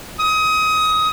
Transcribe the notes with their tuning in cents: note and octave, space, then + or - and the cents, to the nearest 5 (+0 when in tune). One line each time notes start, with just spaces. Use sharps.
D#6 +25